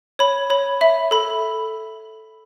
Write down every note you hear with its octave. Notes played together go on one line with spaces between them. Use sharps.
C#5 B5
C#5 B5
E5 B5
A4 B5